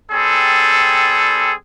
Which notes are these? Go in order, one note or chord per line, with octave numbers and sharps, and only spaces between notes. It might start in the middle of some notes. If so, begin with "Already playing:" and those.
G3 C4 G#4 A4